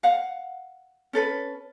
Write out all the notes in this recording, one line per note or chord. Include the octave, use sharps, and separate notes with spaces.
F5 F#5
C#4 A4 B4